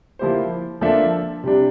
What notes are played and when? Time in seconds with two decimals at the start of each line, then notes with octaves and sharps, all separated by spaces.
0.19 F3 A#3 E4 G4 C5
0.81 F3 A#3 D4 A4 E5
1.44 C3 G3 D4